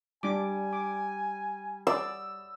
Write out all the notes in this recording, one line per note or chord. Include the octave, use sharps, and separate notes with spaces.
G3 D4 G#5 D6
D6
D5 E6